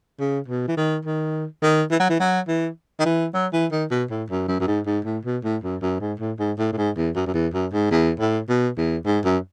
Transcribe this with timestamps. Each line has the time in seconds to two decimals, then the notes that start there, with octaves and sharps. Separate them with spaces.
0.19 C#3
0.48 B2
0.68 E3
0.77 D#3
1.05 D#3
1.63 D#3
1.91 E3
2.00 F#3
2.10 E3
2.20 F#3
2.48 E3
2.99 D#3
3.06 E3
3.34 F#3
3.53 E3
3.72 D#3
3.91 B2
4.11 A2
4.30 F#2
4.48 F#2
4.60 F#2
4.67 G#2
4.86 G#2
5.05 A2
5.25 B2
5.44 A2
5.63 F#2
5.82 F#2
6.00 G#2
6.19 A2
6.39 G#2
6.58 A2
6.72 A2
6.77 G#2
6.97 E2
7.15 F#2
7.27 F#2
7.34 E2
7.54 F#2
7.73 G#2
7.91 E2
8.20 A2
8.49 B2
8.77 E2
9.06 G#2
9.24 F#2